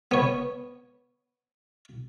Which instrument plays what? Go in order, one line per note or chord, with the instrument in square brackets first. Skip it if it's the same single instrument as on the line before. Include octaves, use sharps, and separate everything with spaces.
[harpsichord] B3 C#5